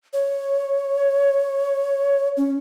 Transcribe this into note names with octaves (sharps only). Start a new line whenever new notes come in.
C#5
C#4